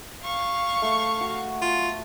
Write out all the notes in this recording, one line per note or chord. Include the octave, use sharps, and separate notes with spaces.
F5 C#6
A3
F#4
F4